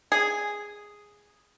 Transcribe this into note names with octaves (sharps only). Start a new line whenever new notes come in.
G#4